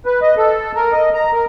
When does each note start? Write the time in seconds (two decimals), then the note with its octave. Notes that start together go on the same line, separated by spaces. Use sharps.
0.06 B4
0.21 D#5
0.37 A4
0.76 A#4
0.92 D#5
1.14 A#5
1.32 A#4